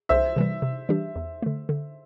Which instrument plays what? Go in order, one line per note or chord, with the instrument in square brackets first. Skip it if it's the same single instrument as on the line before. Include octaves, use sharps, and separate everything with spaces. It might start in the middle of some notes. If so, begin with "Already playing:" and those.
[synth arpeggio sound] C2 [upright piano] C5 E5
[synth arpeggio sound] C3 E3 G3
C3
E3 G3 D4 G4
E2
D3 A3
D3